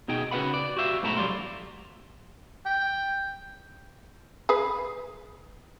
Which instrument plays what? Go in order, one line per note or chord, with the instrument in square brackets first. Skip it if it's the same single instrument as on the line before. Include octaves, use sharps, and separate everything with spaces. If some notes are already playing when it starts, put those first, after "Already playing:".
[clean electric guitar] B2 D#4 G#4 G5
C#3 F#4 B4 F5 F#5 B5
D5
F#4 G4 E5 F5
G#2 B2 A3 E4 F#4 A#5
F#3 G4 D5 F5 C6
[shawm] G5
[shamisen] G#4 B4